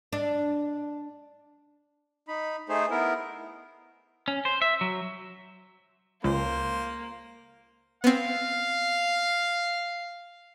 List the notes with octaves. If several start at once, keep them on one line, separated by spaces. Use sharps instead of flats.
D4
D#4 B5
A3 D#4 G#4 C5
B3 E4 A#4
C#4
C5
E5
F#3
C#2 A#3 C5
B3 C4 F5